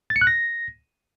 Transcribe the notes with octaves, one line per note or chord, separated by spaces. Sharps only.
A6
C#7
F#6
A#6